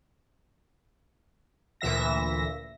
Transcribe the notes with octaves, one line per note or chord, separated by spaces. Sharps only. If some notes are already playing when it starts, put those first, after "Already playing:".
D2 A#2 E3 E5 A#6